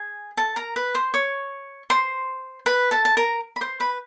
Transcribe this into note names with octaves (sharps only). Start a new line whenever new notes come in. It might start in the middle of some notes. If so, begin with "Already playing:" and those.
Already playing: G#4 G#5
A4 A5
A#4 A#5
B4 B5
C5 C6
C#5 C#6
C5 C6
B4 B5
A4 A5
A5
A#4 A#5
B5
C5 C6
B4 B5